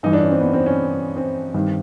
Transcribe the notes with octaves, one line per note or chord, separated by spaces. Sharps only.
G2 E3 D#4
D4
C#4
C4
B3
C4
C#4
C4
G2 D#3